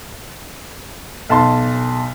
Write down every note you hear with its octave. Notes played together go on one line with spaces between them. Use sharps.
B1 A5 C6